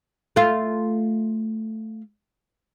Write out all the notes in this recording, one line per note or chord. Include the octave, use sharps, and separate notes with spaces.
A3 F4